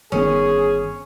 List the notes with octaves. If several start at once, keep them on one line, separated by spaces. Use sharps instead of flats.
G1 D#3 B3 C#4 G#4